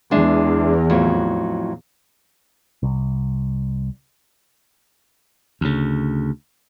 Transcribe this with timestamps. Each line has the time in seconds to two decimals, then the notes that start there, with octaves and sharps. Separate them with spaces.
0.11 E2 G#3 D4 E5
0.90 F2 A2 F#3
2.83 C2
5.61 D2 C#3